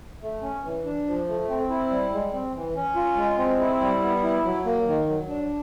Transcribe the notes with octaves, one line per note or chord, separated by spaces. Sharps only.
A3
C#4
E3
D4
F3
A3
C4
E4
G3
G#3
C4
E3
C#4
F4
G#3
C4
E4
G3
B3
E4
F#3
A#3
D#3
F#3
D4